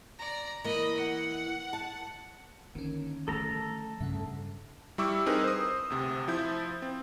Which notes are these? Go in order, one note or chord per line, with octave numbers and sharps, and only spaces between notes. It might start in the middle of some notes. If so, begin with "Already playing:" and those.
D5 A#5
E3 A#3 D#5 B5
F#5
A5
D3 D#3 A#3 C#4
F3 A3 A4 A#5
G2 C#3 E5 F#5
G3 E4 C#6 D6 E6
C4 D#4 G#4 A#4 B4
C5 D#6
D2 C3
F3 E4 G6
C4